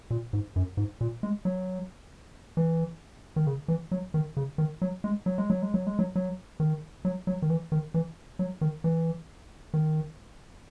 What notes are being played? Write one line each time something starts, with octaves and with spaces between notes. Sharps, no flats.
A#2
G#2
F#2
G#2
A#2
G#3
F#3
E3
D#3
C#3
E3
F#3
D#3
C#3
D#3
F#3
G#3
F#3
G#3
F#3
G#3
F#3
G#3
F#3
F#3
D#3
F#3
F#3
D#3
E3
D#3
E3
F#3
D#3
E3
D#3